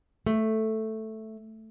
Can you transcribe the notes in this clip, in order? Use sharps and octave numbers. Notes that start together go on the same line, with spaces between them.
A3